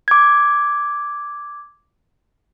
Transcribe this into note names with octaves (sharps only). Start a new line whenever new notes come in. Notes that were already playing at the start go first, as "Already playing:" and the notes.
D6 G#6